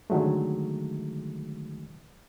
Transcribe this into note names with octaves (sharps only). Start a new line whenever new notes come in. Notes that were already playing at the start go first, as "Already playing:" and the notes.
D3 D#3 F#3 G#3 A3